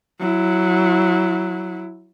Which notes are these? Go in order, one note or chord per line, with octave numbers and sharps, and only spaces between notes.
F#3 E4